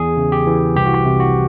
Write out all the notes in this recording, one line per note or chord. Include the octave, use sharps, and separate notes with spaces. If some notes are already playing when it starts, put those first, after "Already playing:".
Already playing: E2 G#4
C#3
G4
E3
C2 G4
F#4
G4
C3
F#4